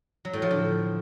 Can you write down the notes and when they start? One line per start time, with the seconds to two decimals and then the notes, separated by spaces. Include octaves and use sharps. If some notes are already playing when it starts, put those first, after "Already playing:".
0.25 F#3
0.33 A2
0.42 F3
0.51 D3